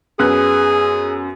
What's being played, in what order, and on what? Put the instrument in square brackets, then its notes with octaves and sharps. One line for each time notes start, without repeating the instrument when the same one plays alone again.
[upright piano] F#2 B3 F#6 [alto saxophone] G#4